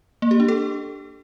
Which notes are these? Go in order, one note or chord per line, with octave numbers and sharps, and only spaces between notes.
A#3
G4
D4
A4